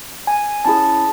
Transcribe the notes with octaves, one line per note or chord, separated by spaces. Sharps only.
G#5
C#4 E4 G#4 A5